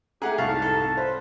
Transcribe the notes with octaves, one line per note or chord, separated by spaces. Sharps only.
A3 G4 G#4 F#5 A#5
C2 F2 G#2 F5 A5 C#6
A4
B4 C5